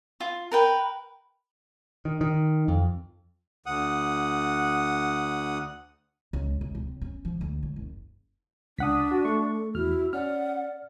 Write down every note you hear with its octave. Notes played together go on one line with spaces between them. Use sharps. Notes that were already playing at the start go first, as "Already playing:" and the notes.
F4
A#4 B4 G5
D#3
D#3
F2
D2 F#5 D#6
C#2
C#2
C3
C#4
F3
D2
C#2
F#1
C#2 D4 F#5 D#6 B6
F#4
A3 C#6
A4
E2 E4 F#4 F6
C#4 D5 F#5 F6